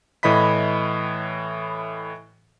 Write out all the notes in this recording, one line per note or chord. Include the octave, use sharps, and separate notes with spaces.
A2 E3 D#5 B5 B6